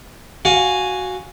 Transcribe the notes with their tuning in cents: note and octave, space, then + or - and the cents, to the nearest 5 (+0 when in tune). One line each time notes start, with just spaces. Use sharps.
F#4 +0 F5 +20 G#5 +0